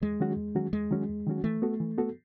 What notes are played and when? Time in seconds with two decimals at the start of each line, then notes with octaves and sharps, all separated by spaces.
0.02 E2 G#3
0.20 D#3 F#3 C#4 F#4
0.37 E2
0.55 D#3 F#3 C#4 F#4
0.73 E2 G#3
0.91 D#3 F#3 C#4 F#4
1.09 E2
1.27 D#3 F#3 C#4 F#4
1.44 E3 A3
1.62 B3 F#4 A4
1.80 E3
1.98 B3 F#4 A4